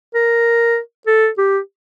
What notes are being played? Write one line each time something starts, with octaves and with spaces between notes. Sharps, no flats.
A#4
A4
G4